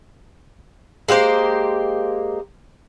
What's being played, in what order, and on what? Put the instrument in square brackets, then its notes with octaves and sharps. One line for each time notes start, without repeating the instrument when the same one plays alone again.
[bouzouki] G#3 A#3 G4 C5